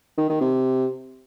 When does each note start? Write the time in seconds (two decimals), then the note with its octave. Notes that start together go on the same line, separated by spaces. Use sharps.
0.18 D#3
0.29 D#3
0.41 C3